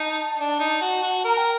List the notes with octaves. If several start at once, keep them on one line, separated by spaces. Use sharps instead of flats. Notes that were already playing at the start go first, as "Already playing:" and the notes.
Already playing: D#4 A5
D4
D#4
F#4
F#4
A#4 A#5
G5